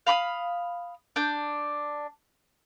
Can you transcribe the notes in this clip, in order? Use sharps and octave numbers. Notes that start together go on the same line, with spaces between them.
F5 B5 D6 D#6
D4 G6